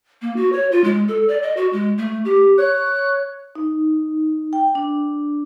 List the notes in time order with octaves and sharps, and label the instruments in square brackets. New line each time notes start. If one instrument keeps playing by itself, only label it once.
[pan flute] A#3
F#4
C#5
F4
G#3
A4
D5
D#5
F#4
G#3
A3
G4
[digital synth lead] C#5 [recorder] F#6
[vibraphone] D#4
G5
D4